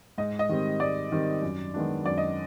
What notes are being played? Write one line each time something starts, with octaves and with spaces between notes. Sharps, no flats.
G#2 D#5
D#5
D#3 G3 C4
G#2 D5
D#3 G3 C4
F#2
D#3 G#3 B3 D4
F#2 D5
D#5